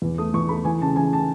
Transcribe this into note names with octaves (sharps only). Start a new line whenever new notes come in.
E2
A3 D#6
E2 C#6
A3 B5
E3 G#5
C#3 A5
E3 G#5
A5